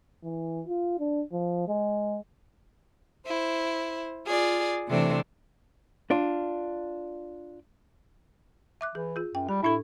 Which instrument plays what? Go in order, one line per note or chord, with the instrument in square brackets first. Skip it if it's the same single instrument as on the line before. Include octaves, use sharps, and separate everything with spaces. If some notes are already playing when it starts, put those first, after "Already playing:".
[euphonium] E3
F4
D4
F3
G#3
[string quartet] E4 C5
F4 G#4 D5
C3 E3 A3 C4 D4
[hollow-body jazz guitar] D4 F4
[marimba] E5 D6 F#6
[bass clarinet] E3 [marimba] G#4
[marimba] F4 G#4
[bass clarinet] F#2 [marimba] G5
[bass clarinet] G3 [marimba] G4
[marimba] A2 D4 A4 [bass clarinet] E4